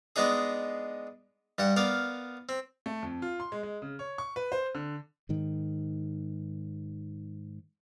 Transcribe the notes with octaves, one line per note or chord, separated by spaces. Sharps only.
G#3 B3 D4 D#4 G#4
G2 G3 F#5
B3 A#4 D5 F5
C4
A3
F2
F4
C6
G#3
G#3
C#3
C#5
C#6
B4
C5
D3
G#2 D#3